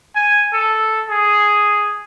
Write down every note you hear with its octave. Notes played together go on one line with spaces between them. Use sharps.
G#5
A4
G#4